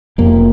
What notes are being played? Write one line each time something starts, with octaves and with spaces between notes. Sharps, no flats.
F1 F2 C3 A#3